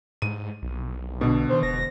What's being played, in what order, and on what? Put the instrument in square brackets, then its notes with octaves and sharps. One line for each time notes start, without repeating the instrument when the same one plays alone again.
[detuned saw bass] G#2 [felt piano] D#7
[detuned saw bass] B1
[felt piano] B2 D3
[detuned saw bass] D#3 [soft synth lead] C5
[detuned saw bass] E1 [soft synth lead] A#6